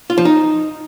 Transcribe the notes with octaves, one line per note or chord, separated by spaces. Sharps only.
F4
F3
D#4